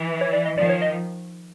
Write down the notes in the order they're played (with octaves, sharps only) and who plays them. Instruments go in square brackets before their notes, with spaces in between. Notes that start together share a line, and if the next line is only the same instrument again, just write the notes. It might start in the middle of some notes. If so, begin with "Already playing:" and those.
Already playing: [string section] E3
[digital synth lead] C#5
D5
D#5
[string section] D#3 F3 [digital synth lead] D5
[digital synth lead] C#5
D#5